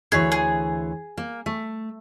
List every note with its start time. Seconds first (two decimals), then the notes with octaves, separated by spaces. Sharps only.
0.12 D2 E3 G#4 C#5
0.32 G#4
1.17 A#3
1.46 A3